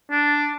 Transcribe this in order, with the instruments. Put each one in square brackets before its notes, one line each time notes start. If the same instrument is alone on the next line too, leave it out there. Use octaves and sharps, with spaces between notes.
[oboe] D4